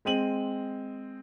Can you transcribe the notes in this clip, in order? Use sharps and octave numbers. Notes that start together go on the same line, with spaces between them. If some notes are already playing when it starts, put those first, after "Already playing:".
G#3 C4 D#7 F#7